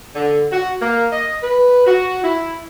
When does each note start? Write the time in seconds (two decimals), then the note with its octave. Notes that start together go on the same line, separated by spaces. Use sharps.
0.15 D3
0.52 F#4
0.81 A#3
1.13 D#5
1.43 B4
1.86 F#4
2.23 E4